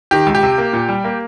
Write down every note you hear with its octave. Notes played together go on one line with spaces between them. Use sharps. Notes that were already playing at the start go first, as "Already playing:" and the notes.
D#3 G4
C#2
G4
C3
A#3
A#2
G3
A#3